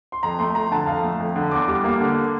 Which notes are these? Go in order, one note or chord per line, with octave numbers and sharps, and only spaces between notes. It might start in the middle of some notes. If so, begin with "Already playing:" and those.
C6
F2 A#5
A3 C6
F2 A#5
D3 A5
F2 F5
A3
F2
D3
E2 D6
G3
A#3
D3